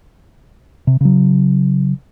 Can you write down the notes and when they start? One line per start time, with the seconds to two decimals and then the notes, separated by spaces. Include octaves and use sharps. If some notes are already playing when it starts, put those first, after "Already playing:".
0.87 C3
1.01 C#3 F#3